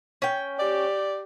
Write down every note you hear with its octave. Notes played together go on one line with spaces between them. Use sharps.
C#4 G5
G4 D5